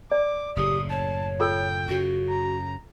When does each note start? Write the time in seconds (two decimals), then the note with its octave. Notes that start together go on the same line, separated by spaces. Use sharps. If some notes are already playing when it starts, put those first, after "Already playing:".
0.12 D5 D6
0.56 F#1 A2 C#3 G4 D#6
0.90 C#5 A5
1.40 F4 A4 G5 E6
1.88 F#2 C#3 F#4
2.29 A#5